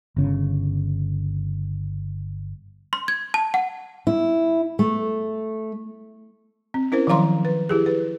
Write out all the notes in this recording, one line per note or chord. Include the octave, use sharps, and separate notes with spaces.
G1 C#3
C6
G#6
A5
F#5
E4
A3
C4
C#4 E4 A#4 C5
D#3 F3 F#3 F5 A#5 C6
B4
E4 G4 G#4
B4